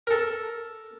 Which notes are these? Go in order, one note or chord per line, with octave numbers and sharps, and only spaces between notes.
A4 A#4